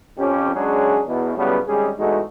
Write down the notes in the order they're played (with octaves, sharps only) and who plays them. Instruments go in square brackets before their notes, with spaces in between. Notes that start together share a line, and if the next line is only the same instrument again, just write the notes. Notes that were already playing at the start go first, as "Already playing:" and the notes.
[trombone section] F2 C#4 G4
F#3 G#3 C#4 D4 G#4
E2 B2
A2 C#3 F#3 G3 B3
G#1 G3 G#3 C#4 G#4
E2 A2 G#3 A3 D#4 F#4